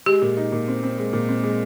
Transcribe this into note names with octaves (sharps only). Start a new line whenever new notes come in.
G#3 G4
A#2
D#4
A#2
C4
C4
G#3
A#2
C4
G#3